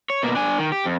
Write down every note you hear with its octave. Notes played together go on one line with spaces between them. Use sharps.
C#5
B2 A#3
D4 G#5
D#3
G4
F2